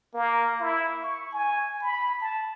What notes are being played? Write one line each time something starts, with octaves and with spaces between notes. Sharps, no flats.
A#3
E4
C#6
G#5
B5
A5